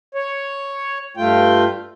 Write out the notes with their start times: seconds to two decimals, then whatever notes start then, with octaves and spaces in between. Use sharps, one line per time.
0.15 C#5
1.17 G2 A3 F4 G5